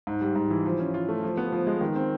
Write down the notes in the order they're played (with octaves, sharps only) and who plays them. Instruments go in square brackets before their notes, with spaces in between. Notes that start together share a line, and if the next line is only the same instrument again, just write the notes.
[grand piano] G#2
G3
G#2
E3
F3
C#4
F4
A3
F3
B3
F3
G#3
D#3
C4